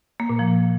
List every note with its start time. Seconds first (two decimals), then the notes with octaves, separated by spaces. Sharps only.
0.20 A#3
0.29 A#2
0.39 F3